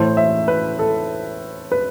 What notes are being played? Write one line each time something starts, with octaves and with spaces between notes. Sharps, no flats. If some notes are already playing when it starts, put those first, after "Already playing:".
Already playing: A2 E3 A3 C5
E5
B4
A4
B4